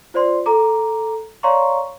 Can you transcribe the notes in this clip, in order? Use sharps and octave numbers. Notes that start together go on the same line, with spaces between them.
F4 C5 D5 C6
A4 A#5 D6
C#5 D5 F5 A#5 C6 C#6